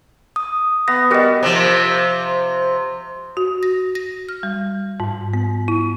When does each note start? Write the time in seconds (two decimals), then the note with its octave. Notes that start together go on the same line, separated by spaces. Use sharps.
0.36 D#6
0.88 B3 A#6
1.11 G3 F#4 A#4 D#5
1.43 C3 F3
3.37 F#4
3.63 A#6
3.95 A#6
4.29 F6
4.43 G3
5.00 G#2
5.33 B3
5.68 E4